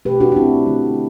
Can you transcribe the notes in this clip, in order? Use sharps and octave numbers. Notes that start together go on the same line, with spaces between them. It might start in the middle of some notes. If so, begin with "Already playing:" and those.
B2 A3 G4 B4
D4 F#4
F#4
C4 E4
D3 F#3 A3